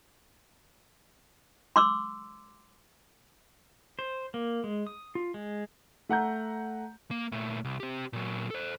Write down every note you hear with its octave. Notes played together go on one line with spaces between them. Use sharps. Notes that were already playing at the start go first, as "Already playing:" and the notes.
C6 D6 E6
C5
A#3
G#3
D#6
F4
G#3
A3 F#5 A#5 G6
A#3
A#2 A3
C2
C4 G4
A#2 F#3
A4 C5